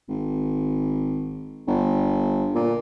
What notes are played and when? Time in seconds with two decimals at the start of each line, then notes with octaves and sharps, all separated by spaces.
0.09 G#1
1.67 G1
2.55 A#2